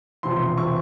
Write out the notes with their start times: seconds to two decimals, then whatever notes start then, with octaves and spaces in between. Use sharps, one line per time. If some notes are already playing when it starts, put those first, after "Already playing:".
0.23 E1 E2 C3 F3 C6
0.58 C3 F3 C#6